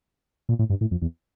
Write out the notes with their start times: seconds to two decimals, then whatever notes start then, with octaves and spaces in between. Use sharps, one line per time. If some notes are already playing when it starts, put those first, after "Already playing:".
0.49 A#2
0.59 A2
0.70 G2
0.81 A2
0.91 F2
1.02 E2